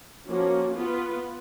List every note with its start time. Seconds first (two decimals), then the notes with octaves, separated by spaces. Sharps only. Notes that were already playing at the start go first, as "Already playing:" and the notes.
0.26 F3 A#3 C#4 F#4
0.76 B3 F4 B4